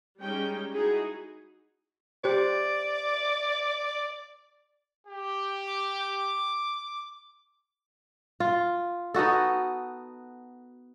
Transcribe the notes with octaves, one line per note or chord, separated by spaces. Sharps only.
G3 G#3 C#4 D#4 G5
D#4 E4 F#4 G#4
G4 C5 D5
G4
D6
F4
B3 D#4 F#4 A4